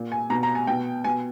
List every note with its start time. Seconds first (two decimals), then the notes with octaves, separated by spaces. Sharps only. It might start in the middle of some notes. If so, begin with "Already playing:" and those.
Already playing: A#2
0.12 G#5
0.30 B2 A#5
0.43 A#5
0.55 G#5
0.67 B2 G5
1.04 B2 G#5